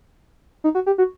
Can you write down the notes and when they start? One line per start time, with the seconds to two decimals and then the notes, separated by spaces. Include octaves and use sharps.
0.64 D#4
0.75 F#4
0.86 G4
0.98 F#4